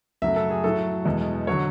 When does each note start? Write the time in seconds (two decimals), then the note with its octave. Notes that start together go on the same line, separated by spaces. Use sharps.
0.22 F#2 C#3 F#3 A3 E5
0.36 A4
0.50 G#4
0.63 A2 F#3 A3 A4
1.05 E2 B2 G#3
1.47 D3 F#3 C#5